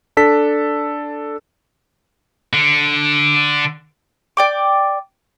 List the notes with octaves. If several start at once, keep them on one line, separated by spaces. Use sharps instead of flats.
D4 A4 B6
D3
D5 G5 D6